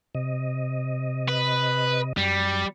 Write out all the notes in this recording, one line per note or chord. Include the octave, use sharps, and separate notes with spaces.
C3 D#5
B4
F#2 G3